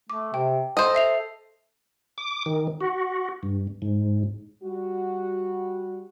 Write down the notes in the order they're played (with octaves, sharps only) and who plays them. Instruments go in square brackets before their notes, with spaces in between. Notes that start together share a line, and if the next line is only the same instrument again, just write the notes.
[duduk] A3 [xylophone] D6
[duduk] C3 [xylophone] G5
[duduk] A4 [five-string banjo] C5 D#5
[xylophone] E5 C7 F7
[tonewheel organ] D6
D#3
F#4
G2
G#2
[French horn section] G3 F#4